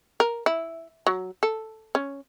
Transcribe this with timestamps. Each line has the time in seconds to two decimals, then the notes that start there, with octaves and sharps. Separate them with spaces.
0.20 A#4
0.46 E4
1.07 F#3
1.43 A4
1.95 C#4